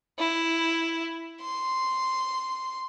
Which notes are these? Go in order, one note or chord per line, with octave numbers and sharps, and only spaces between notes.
E4
C6